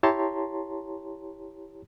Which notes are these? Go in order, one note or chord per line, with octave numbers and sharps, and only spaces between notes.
E4 G4 C#5 A5 A#5 C6